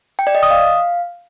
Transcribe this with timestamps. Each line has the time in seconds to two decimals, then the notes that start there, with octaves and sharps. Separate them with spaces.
0.19 G5
0.27 D5
0.35 D#5
0.43 D#6
0.51 F5